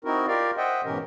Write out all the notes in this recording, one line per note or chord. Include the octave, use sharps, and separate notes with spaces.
C4 D#4 E4 F#4 A#4
F4 G4 A#4 D5 F5
C5 D#5 E5 F#5 G5
G#2 B2 E3 C#4 G4 A#4